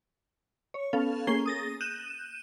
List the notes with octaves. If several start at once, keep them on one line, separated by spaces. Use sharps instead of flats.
C#5
B3 C#4 A4 F5
A#3 C#4 G#4 C7 G7
D#6 A6 A#6
F#6 G6 D#7 E7